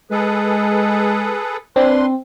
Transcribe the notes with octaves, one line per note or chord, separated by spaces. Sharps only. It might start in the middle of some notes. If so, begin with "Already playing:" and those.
G#3 G#4 A4 B4
C4 D4 B4 C6